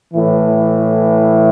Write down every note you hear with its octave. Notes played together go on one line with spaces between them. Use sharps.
A2 E3